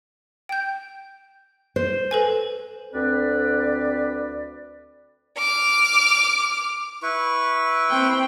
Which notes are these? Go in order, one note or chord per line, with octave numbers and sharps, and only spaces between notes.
G5 G6
C5
A4 B4 G#5
D2 C4 B4 D5
D6 F6
E4 B4 C#6
C4 G5